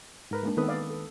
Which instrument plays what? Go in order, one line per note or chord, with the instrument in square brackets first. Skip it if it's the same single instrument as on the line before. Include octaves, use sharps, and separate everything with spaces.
[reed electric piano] G#2 A#4 B4
[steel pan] G#3 A#3 D4
[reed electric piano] D#3 B4 D#6 [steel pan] B3 C4 A4
[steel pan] D5 F5
A4